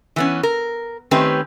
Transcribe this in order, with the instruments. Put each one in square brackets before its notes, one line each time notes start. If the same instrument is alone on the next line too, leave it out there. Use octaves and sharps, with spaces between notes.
[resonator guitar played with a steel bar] E3 B3 C#4
A#4
D#3 A3 C4 C#4 G4 B4